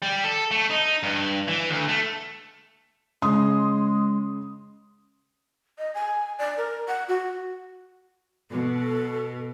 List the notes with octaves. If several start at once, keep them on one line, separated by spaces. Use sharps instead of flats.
G3
A4
A3
D#4
G2
E3
D2
A3
C#3 G#3 C6 D#6
D#5
G#5
D5
A#4
F#5
F#4
B2 A4